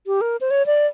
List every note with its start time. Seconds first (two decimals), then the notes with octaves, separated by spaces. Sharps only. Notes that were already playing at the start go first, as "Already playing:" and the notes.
0.07 G4
0.21 A#4
0.41 C5
0.51 C#5
0.66 D5